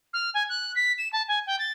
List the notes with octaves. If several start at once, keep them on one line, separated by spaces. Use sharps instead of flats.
F6
G#5
F#6
B6
E7
A5
G#5
G5
A6